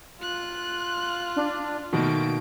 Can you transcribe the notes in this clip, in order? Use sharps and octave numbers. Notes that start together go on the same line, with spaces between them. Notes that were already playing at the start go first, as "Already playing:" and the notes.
F4 F#6
D4
B2 D#3 A3 A#3 D7